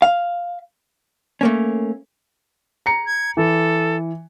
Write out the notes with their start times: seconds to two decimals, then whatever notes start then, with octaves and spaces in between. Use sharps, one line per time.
0.02 F5
1.41 A3 A#3 C#4
2.86 A#5 C#7
3.06 G#6
3.37 E3 A4